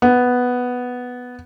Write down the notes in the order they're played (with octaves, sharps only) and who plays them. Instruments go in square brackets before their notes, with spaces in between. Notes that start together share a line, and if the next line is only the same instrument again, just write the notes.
[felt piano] B3